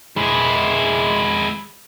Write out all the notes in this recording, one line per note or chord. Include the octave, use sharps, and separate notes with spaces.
G#3 E4